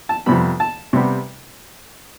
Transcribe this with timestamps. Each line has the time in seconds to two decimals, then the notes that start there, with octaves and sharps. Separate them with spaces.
0.09 A5
0.26 F2 C3 G3 B3 B5
0.60 A5
0.93 C3 G3 B3